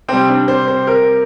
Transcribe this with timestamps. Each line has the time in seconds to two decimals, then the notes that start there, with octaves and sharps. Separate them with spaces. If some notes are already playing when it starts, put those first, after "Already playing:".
0.08 C3 G3 C4
0.29 D4
0.48 C5
0.68 C5
0.87 A#4